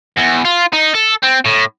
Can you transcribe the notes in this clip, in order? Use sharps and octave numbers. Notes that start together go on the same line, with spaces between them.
E2
F4
D#4
A4
C4
A2